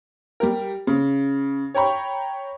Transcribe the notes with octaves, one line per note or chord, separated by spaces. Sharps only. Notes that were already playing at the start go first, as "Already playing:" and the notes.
G3 G4 A#4
C#3
C#5 G5 A#5 B5 C#6